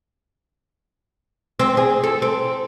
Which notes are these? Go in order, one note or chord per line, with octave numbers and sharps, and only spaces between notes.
C4
G#4
A4
C4